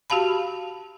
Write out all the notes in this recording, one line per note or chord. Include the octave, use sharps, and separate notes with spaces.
F#4 G4 F5 A5 B5